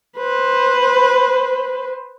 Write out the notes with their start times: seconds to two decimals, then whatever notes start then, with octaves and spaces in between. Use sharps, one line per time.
0.18 B4 C5